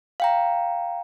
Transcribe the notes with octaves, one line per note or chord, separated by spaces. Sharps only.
F5 G5 A#5